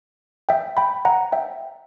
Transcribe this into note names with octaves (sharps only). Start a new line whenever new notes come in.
E5 G5
G5 B5
F#5 A#5
E5 G5